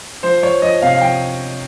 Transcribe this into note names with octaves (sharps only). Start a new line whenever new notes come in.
F3 C5
F3 C#5
F3 D#5
C3 F5
F5
F3 G5